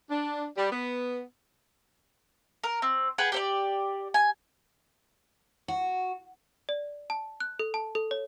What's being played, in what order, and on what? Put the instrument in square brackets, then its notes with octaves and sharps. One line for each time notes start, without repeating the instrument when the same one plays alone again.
[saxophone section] D4
G3
B3
[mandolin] A#4
C4
G#4 B4 F#5 G5
G4 C5 D5
G#5
[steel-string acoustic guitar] F#4
[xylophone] D5
A5
F#6
A4
A5
A4
C#5